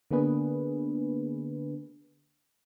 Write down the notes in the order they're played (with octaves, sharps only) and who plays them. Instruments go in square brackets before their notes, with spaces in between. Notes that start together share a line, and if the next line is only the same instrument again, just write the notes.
[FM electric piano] D3 A#3 B3 D4 G#4 B4